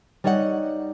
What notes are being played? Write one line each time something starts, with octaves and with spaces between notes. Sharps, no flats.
G3 D#4 C#5 D#5 E5 F#5